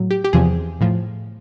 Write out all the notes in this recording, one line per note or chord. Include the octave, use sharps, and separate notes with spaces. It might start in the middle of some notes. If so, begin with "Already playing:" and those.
Already playing: A2 F#3
G4
G4
E2 C3 F3 G#4
A2 F3